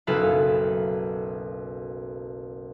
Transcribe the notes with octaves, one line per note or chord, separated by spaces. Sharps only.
F#1 B1 E4 A4 B4 F5